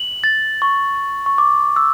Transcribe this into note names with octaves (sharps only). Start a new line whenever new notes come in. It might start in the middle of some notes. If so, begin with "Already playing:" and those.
Already playing: F#7
A6
C#6
C#6
D6
E6